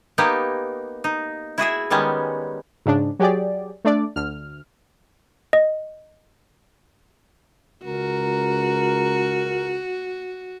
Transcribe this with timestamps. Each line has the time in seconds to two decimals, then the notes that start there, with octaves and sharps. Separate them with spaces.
0.18 A#3 B3 D#4 G4
1.04 D#4
1.58 E4 F#4 G#4 E5
1.90 D#3 G3 G#3 B3 C#4
2.86 G#2 C#3 D4
3.19 F#3 G4 G#4 D5
3.85 A3 D4 D5
4.16 D2 F6
5.53 D#5
7.85 C#2 F#4 A#4